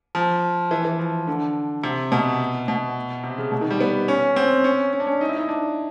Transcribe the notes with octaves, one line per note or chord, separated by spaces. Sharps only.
F3
E3
E3
F3
D3
C3
B2
B2
C3
C#3
B2
D#3
G3
B3
C#4
C4
C#4
C#4
D4
C#4
D#4
E4
D#4
D4